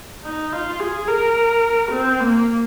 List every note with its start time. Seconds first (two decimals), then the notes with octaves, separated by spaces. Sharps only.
0.24 D#4
0.52 F4
0.80 G#4
1.08 A#4
1.92 C4
2.20 A#3